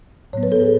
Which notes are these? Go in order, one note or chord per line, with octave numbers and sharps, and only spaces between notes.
A2 F#3 B3 C#5
B4
A4
G#4